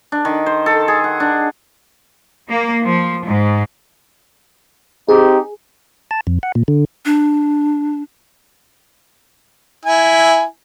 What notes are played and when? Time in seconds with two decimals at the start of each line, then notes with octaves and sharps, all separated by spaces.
0.12 D4
0.25 D#3
0.46 C5
0.66 A4
0.88 G#4
1.04 F#5
1.20 D4
2.49 A#3
2.84 F3
3.25 G#2
5.09 C4 D#4 G4 G#4
6.11 A5
6.27 F2
6.43 F#5
6.55 A#2
6.68 D3
7.05 D4
9.85 E4 G#5